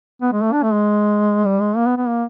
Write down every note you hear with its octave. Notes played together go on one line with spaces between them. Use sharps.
B3
G#3
A3
D4
A3
G#3
G3
G#3
A#3
B3
B3
A#3